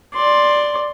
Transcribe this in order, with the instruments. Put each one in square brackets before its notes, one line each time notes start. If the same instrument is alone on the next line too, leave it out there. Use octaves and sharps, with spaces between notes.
[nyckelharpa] D5 C6